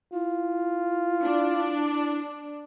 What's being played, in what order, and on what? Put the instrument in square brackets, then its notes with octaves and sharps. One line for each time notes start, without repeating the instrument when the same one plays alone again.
[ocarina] E4 [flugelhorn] F4
[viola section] D4